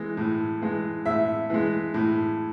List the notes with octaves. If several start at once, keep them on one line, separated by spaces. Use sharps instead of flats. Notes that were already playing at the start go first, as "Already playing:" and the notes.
Already playing: E3 G#3
A2
E3 G#3
A2 E5
E3 G#3
A2